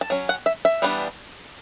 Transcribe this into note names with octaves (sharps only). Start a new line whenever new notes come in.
A5
F#3 C#4
F#5
E5
E5
E3 G3 B3 D4